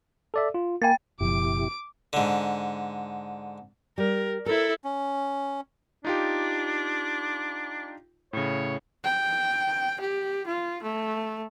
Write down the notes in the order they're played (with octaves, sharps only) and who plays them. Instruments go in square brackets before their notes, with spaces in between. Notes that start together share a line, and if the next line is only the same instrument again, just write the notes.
[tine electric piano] A4 D5 E5
F4
[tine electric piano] A#3 G#5 [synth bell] G5 A6
[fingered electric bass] F#1 F3 [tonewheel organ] B2 E4 G4 [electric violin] D6 D7
[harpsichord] G#2 D3
[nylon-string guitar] G3 [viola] A#4
[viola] E4 A4 [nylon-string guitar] A#4 C5
[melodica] C#4
[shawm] D4 [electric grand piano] D#4 F4 G4
[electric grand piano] A2 C#3 [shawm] C#5
[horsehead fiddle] G5
G4
F4
A3